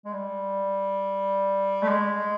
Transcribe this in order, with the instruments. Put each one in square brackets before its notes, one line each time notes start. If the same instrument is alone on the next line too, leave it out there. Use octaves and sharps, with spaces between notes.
[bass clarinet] G#3
G3
A3
G#3